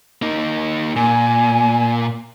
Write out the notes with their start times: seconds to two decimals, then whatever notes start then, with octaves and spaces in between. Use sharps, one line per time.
0.22 A#3 D#4
0.96 A#2 G#5